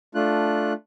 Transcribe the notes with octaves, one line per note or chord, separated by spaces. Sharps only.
A3 D4 F4 F#6